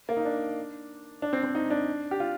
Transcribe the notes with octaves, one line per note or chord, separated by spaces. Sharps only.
A#3
D#4
D4
D4
C4
C4
D#4
D4
G4
F4